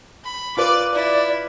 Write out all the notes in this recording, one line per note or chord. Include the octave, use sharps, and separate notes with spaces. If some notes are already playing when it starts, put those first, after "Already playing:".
B5
F4 B4 D5 D6
E4 D5